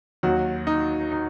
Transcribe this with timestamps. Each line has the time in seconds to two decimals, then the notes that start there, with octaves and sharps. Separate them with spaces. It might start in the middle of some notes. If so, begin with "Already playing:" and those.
0.23 D#2 D#3 F#3 F#4
0.67 D#4
1.12 D#4